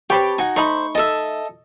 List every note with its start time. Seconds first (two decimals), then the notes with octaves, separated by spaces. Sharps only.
0.10 C4 G4 B4 C#5 G5 A5 B5
0.38 D#4 F#4 G#5
0.56 A3 D#4 C5 B5 C#6
0.95 A4 D#5 E5 A5